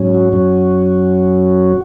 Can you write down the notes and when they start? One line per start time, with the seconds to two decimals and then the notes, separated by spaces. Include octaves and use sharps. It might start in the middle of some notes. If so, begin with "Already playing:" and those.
Already playing: G#2 F#3 C#4
0.14 F#4
0.32 F#2 F#3 C#4